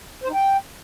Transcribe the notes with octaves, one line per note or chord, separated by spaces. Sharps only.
C5
D#4
G5